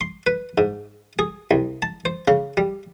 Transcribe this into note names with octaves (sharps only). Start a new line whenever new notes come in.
C6
B4
G#2
G#4
C2
A5
C5
C#3
G3